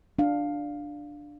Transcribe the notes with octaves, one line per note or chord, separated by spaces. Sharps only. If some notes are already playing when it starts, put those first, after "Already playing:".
D4 F5